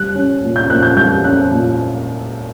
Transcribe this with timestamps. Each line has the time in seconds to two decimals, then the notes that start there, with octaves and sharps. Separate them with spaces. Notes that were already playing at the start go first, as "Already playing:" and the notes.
Already playing: G3 F#6
0.14 C#4
0.42 A#2
0.56 G6
0.70 A#2 F#6
0.83 G6
0.96 G3 G6
1.24 C#4 F#6
1.51 A#2